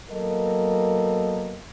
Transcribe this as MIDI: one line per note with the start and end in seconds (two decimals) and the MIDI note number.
0.10 1.59 54
0.10 1.59 58
0.10 1.59 59
0.10 1.59 69
0.10 1.59 70
0.10 1.59 75